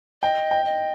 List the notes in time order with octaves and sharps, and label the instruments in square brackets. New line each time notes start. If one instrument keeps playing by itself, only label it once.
[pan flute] D#5 [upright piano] G5
[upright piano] G5
[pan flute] D#5